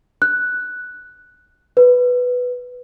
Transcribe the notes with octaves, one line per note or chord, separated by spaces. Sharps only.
F#6
B4